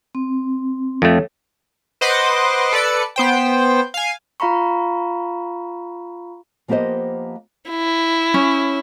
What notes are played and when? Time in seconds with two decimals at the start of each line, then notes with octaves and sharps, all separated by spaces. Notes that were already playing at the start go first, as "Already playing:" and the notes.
0.15 C4
1.02 F2 A3 A4 C#5
2.01 B4 C5 D#5 F#5 C6 D6
2.72 A4 B4 D5 C#7
3.16 B3 C5 G5
3.94 F5 G#5
4.40 F4 F5 A#5 B5 C#6
6.68 F3 A#3 B3 G4 C5 D#5
7.70 E4
8.34 C#4